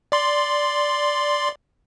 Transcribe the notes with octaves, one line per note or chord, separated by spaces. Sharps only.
D5 C6